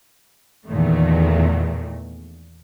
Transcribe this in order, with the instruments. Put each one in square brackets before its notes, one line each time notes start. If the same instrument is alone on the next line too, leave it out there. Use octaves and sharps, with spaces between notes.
[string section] E2 A#2 D#3 A3